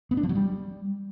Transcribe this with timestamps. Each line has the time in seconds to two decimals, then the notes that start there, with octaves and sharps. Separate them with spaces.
0.11 B3
0.17 D4
0.23 F3
0.29 F#3
0.35 G3